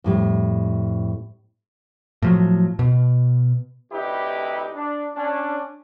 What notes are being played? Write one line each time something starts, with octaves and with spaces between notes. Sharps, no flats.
F2 A2 G3
A2 F3 F#3
B2
D2 C3 D#4 E4 G4 B4
D4
C#4 D4